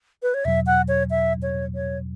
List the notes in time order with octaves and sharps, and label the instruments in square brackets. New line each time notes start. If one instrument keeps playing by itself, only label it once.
[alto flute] B4
C#5
[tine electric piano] E2 B2 F#3 [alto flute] E5
[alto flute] F#5
C#5
E5
C#5
C#5